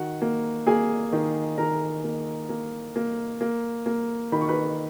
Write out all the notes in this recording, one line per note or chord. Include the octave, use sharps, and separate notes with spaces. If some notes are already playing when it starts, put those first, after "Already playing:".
Already playing: D#3 F#4 F#5
A#3
A#3 G#4 G#5
D#3
D#3 A#4 A#5
A#3
A#3
A#3
A#3
A#3
D#3 B5
C#6
B4 B5